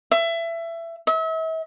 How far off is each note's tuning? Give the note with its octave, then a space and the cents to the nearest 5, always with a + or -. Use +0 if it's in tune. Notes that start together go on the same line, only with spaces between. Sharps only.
E5 +20
E5 -40